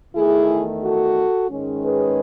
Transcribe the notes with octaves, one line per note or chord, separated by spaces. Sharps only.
E2 D#3 A3 E4 G#4
F#4 A4
G#2 D#3 G#3 C#4
G#4 B4